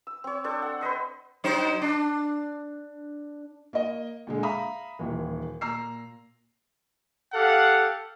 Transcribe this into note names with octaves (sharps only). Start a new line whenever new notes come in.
E6
C4 C#5
D4 A4 C5
F#5
B4 C5 D#5 C6
F#3 D#4 C5
D4
A#3 D#5
A#2 D3 G#3
E5 F5 A#5 B5 D#6
D#1 D#2 E3
A#2 A#5 E6 C7
G4 A4 F5 F#5